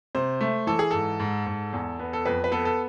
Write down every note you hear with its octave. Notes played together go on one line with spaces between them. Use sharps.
C3 C5
A3
E3 A4
G#4
G#2 A4
G#2
G#2
E2
B3
A4
F2 B4
B4
B3 A4
A4